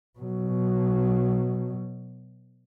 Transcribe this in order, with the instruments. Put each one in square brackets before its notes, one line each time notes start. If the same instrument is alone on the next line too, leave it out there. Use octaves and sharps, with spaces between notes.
[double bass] B2 F#3